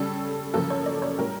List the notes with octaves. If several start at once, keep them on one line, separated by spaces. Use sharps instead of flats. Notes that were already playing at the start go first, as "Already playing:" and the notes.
Already playing: C#3 G3 C#4 A4
C#3 F3 A#3 C#4 A4
C#5
D5
C#5
A2 G3 C#4 A#4